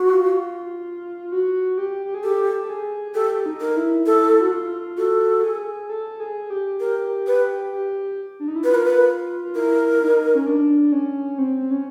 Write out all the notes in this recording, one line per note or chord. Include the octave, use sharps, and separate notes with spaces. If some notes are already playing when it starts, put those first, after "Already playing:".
Already playing: F#4
F4
F#4
G4
G4
G#4
G4 A4
A4
G#4
G4 A4
D#4
A#4
E4
E4 A4
F#4
F4
F#4 A4
G#4
A4
G#4
G4
G4 A#4
B4
G4
D4
D#4
E4
F4 B4
A#4
B4
F4
E4 A#4
D#4
C#4
D4
C#4
C4
C4
C#4